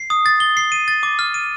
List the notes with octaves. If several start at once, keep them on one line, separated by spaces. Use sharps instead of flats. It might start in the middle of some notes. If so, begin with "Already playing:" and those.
Already playing: C7
D#6
A6
G7
C7
D#7
A6
D6
F6
D#7